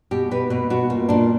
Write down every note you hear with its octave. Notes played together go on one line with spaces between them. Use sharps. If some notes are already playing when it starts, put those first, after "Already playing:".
B2 G4
B2 B4
B2 B4
B2 F#4
A#2
A#2 D4